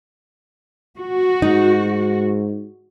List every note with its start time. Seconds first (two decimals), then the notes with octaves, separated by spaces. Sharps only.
0.97 F#4
1.42 G#2 D#4